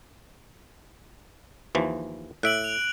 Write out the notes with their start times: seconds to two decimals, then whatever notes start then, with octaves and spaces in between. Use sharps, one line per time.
1.75 D#2 E3 F3
2.43 A2 E5 F#6 D7 F#7
2.64 F7